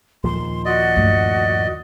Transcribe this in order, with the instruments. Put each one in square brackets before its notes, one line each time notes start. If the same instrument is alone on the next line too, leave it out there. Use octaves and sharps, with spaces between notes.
[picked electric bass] D#2 A#2 F3 [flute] C6
[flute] F#4 [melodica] D5 D#5
[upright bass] G2 A3